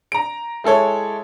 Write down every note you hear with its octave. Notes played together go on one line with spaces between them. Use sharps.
A#5 D7
G#3 E4 A4 C#5